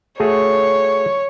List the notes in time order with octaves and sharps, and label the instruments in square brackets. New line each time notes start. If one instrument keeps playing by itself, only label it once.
[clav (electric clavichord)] A3 F#4 G#4 [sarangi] C#5